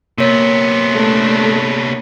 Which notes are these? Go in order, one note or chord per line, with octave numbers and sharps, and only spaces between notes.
C3 A#3 B3 C#5
A3 D4